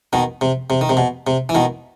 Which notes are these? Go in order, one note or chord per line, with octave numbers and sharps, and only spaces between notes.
B2 D#3
C3
C3
D#3
C3
B2
C3
E3
B2 D#3